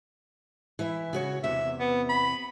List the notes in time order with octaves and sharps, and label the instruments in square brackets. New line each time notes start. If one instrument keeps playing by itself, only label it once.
[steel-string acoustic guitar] E3 E4 E5
C#3 F#4 C#5
[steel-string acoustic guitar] E2 C3 [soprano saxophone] E5
[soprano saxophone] B3
B5